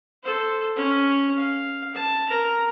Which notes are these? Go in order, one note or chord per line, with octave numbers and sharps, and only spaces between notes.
A4 C5
C#4
F5
A5
A#4 A#5